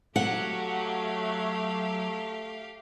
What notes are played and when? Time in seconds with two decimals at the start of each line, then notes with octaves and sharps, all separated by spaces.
0.16 F#3 A3 G4 F5 F#5